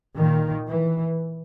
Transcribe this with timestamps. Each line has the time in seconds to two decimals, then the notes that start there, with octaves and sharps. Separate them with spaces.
0.17 A#2 D#3
0.67 E3